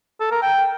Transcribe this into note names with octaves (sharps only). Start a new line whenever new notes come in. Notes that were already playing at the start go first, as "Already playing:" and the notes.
A4
A#4
G5